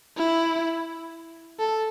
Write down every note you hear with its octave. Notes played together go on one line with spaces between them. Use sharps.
E4
A4